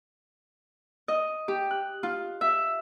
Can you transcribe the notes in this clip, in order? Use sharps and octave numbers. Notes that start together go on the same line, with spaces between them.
D#5
G4
F#6
F4
E5